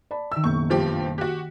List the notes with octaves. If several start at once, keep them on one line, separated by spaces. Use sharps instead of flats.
D5 A5 B5
D#3 E5 E6
F#1 B1 C#6 G6
G2 F3 G4
F#4 G4 F#6 B6